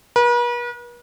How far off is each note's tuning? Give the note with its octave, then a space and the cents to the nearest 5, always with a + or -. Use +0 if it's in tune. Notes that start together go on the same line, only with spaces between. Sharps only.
B4 -45